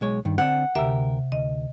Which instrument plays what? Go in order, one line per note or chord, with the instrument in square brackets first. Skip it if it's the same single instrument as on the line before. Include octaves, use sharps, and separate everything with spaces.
[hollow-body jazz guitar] B1 G#3 C#5
G2 D#3
[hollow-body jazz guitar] D3 C4 D4 [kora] F#5
[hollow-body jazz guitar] D2 G4 A#4 [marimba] C3 E5
[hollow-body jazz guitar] D2 [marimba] D#5